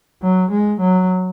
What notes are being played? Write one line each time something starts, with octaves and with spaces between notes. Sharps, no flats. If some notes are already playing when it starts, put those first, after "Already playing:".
F#3
G#3
F#3